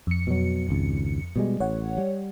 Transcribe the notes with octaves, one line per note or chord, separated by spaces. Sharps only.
F2 C#7
B2 F#3
G#1 C#2
B2 G3 G#3
A1 C#5 F#5
G3